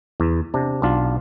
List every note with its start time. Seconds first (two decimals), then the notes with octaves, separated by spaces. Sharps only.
0.20 E2
0.54 C3 D4
0.82 B1 D4 F4